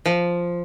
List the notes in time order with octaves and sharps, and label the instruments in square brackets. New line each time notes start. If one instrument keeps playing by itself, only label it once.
[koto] F3